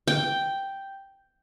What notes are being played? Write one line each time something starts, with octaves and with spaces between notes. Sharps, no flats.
G5